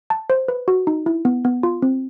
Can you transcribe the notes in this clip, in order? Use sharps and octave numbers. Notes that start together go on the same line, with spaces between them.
A5
C5
B4
F#4
D#4
E4
B3
B3
F4
C4